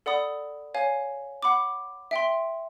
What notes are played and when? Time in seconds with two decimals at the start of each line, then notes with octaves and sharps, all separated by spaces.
0.06 A4 D5 F#5 B5 D#6
0.74 C#5 F5 G#5
1.43 F#5 B5 D6
2.11 E5 G5 C6